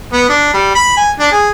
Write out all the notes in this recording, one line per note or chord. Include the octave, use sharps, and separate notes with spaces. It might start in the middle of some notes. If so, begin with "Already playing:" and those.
B3
D4
G3
B5
G#5
D4
G#4